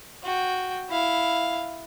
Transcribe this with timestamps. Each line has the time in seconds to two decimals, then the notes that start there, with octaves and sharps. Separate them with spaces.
0.23 F#4 G5
0.90 E4 F5